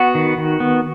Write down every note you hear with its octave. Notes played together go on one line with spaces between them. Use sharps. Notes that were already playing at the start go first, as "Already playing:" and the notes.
Already playing: B3 F#4
D#3
D#3
B3